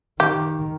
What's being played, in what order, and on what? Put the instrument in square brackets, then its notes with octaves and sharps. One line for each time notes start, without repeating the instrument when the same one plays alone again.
[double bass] D#3 [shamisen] G4